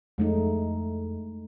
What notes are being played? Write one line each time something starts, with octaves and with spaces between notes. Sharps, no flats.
F2 G#3 A3 D#4